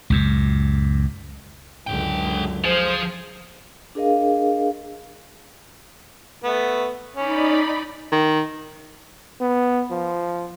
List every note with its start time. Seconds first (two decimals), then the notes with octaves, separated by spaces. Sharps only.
0.10 C#2 F#2 A#2
1.87 C#2 F#2 D3 G#4 G5
2.64 F3 G#4 C5
3.95 D4 G#4 A#4 D#5 F5
6.44 A3 B3
7.16 C#4 D#4 D5 B5
8.12 D#3
9.41 B3
9.91 F3